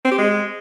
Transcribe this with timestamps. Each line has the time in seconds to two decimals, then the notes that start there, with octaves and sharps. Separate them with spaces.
0.05 C4
0.11 G4
0.18 G#3